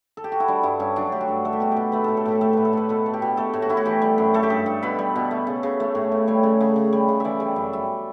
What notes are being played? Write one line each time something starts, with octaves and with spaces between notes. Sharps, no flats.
A4
G4
F#4
E4
G3 D4
G2 E4
G2 C#4
F#3 D4
A3 G4
F#4
G2
A3 A4
G4
B2 F#4
B2 G4
A3 B4
A2 A4
A4
A2 G4
A3 A4
A2 B4
A4
A2 B4
B2 A4
A3
G4
B2
A3 A4
A2
F#4
A2 E4
F#4
E3 G4
G3
F#2
A3 A4
G4
G2 A4
G2
B2 B4
G3
B2
A3
C#3
C#3
A3
A2
A2
G3 C#5
C#3
C#3
C#3
G3
C#3
E3 D5 E5
G3
F#2
G3 E5